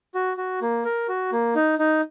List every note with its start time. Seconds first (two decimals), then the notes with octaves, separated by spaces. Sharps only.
0.14 F#4
0.37 F#4
0.61 A#3
0.85 A#4
1.08 F#4
1.32 A#3
1.55 D#4
1.79 D#4